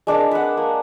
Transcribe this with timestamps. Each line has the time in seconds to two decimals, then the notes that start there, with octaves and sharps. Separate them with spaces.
0.07 G#3 D4 A#4 A5
0.31 B4 F#5
0.57 A#3